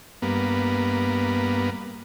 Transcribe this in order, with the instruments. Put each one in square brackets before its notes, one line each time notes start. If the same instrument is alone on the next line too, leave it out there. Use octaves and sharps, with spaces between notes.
[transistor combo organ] G2 A#3 B3